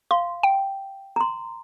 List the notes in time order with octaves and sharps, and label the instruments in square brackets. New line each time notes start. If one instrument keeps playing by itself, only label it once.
[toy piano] F5 [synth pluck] C6
[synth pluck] G5
[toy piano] A#5 C6